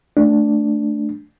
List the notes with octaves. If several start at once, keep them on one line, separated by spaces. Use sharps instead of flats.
A3 D4